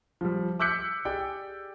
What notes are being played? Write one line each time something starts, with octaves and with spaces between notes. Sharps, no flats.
F3 G3
D6 E6 F#6 G6 B6 C#7
G4 G#4 D5 G5